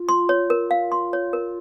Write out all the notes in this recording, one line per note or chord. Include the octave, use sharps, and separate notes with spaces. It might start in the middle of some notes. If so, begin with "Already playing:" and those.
Already playing: F4
C6
C#5
A#4
F5
C6
C#5
A#4